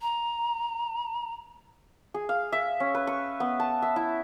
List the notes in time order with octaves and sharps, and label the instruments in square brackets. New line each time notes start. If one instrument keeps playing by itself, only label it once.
[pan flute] A#5
[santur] G#4
F5
E5
C#4
B4
C#6
B3
A5
E5
E4